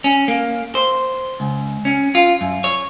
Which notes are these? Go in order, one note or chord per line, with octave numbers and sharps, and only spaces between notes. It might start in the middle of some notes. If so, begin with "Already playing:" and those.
C#4
A#3
C5
C#2
C#4
F4
F#2
C#5